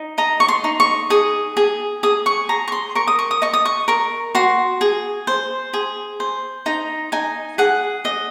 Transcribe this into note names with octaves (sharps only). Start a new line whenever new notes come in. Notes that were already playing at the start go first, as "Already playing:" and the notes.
Already playing: D#4
D#5 A#5
C#6
C6
D#4
C#6
G#4 D#6
G#4
G#4 D#6
C#6
G#4 A#5
C#6
C6
A#4 C#6
D#6
C#6
D#6
D#5 C#6
D#6
C#6
A#4 C#6
F#4 C6
G#4
C5
G#4
C5
D#4 A#5
D#4 G#5
G#4 F#5
D#5